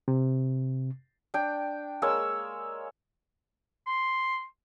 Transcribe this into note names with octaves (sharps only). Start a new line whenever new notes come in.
C3
D4 G5
G#3 A#3 C#5 E6
C6